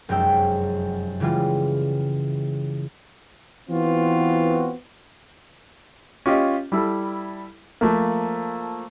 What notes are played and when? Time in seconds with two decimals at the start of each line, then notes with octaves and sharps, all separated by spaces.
0.09 F1 F#2 G#3 G5 E6
1.20 C#3 E3 G3 G#3 F4
3.69 E3 B3 C4 F4 F#4
6.26 C#4 F4 G4 D#5
6.72 G3 E4 A4
7.81 F3 A3 A#3